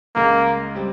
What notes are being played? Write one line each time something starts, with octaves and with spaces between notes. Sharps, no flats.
C#2 C#3 G#3 A#3
G3 C4 G4